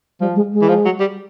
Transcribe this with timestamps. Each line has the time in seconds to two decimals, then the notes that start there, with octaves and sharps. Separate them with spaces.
0.20 F3 G3
0.35 G#3
0.53 G#3
0.61 E3
0.68 F3
0.85 F#3
1.00 G3